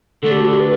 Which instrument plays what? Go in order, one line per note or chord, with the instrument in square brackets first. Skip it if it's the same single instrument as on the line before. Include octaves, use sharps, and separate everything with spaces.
[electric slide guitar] D3 A3 D4 [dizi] A4
[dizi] G4
F#4
G4
B4